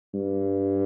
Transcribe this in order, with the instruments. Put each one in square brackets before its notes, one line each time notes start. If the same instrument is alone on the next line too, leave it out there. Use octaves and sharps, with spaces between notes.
[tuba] G2